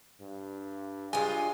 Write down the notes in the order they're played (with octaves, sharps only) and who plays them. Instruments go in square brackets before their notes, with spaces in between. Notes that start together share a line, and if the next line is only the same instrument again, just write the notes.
[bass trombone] G2
[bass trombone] G2 [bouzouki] G#3 F4 [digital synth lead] G#5